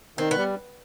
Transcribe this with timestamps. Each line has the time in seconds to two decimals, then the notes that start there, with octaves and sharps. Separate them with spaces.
0.18 D#3 C4
0.31 B3
0.37 G3